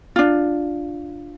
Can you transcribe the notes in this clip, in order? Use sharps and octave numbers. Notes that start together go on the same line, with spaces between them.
D4 F4